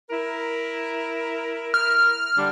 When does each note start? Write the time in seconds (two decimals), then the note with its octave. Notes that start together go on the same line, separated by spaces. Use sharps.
0.10 E4 A#4
1.74 F6
2.36 D3 G3 D4